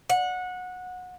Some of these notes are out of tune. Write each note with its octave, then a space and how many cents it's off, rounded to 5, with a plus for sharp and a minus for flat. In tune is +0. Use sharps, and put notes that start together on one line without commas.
F#5 -20